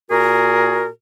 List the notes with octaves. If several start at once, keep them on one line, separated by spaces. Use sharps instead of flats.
A#2 F#4 G#4 A#4